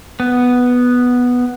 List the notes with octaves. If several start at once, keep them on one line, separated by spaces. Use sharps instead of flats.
B3